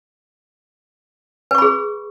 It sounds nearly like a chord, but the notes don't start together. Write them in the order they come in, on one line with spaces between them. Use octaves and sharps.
B4 C#6 B5 G#4